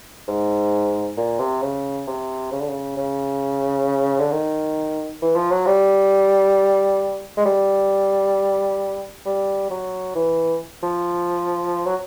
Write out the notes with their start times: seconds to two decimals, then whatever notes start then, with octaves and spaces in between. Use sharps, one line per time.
0.28 G#2
1.17 A#2
1.39 C3
1.62 C#3
2.07 C3
2.52 C#3
2.61 D3
2.69 C#3
2.97 C#3
4.20 D3
4.32 D#3
5.22 E3
5.36 F3
5.52 F#3
5.67 G3
7.37 G#3
7.46 G3
9.26 G3
9.71 F#3
10.15 E3
10.83 F3
11.86 F#3